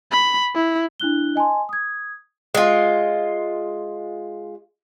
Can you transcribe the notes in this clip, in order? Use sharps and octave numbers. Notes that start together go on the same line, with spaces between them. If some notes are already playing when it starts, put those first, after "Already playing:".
B5
E4
D4 E4 F#6 G7
D#5 G#5 A5 C6
D#6 G#6
G#3 F4